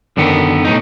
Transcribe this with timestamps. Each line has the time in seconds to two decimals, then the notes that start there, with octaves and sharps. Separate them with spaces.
0.17 F#2 D3 D#3 B3
0.65 B1 A2 D#4